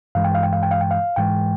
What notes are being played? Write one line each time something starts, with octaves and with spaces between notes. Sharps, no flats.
G2 E3 G#3 F5
G5
F5
G5
F5
G5
F5
G5
F5
G#2 E3 G#3 G5